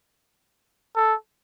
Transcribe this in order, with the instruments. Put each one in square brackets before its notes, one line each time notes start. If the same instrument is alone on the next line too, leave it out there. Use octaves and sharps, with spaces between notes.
[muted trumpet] A4